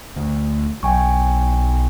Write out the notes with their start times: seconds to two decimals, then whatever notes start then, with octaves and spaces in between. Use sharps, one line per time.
0.16 D2
0.83 B1 G5 G#5 C#6